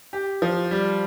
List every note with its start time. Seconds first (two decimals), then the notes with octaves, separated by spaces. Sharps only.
0.13 G4
0.42 F3
0.71 G3